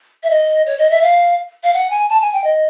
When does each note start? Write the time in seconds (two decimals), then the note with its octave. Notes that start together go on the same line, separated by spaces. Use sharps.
0.23 E5
0.30 D#5
0.66 C#5
0.79 D#5
0.91 E5
1.02 F5
1.64 F5
1.74 F#5
1.90 G#5
2.09 A5
2.21 G#5
2.33 G5
2.44 D#5